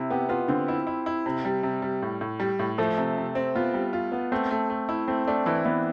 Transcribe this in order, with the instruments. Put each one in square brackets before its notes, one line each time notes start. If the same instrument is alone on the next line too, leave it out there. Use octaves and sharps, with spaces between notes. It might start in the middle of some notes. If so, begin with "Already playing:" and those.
Already playing: [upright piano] C3 [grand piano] E4
[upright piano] B3 [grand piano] G4
[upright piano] B3 [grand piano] F4
[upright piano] D3 [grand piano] C4
[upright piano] E4
E4
E4
C3
G3
C3
G3
A2
A2
G3
A2
[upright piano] F3 [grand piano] A3
[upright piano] C3
C3
C4
[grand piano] B3 [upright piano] F4
[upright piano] G3
F4
B3
[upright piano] A3 [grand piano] C4
[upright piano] A3
A3
E4
[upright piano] A3 [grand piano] C4
[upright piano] A3 [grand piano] D4
[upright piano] E3 [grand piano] E4
[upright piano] E3 [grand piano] B3